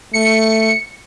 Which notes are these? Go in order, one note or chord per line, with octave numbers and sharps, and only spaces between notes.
A3 C#7